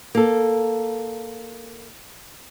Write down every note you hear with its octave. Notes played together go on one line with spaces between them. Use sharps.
A#3 A4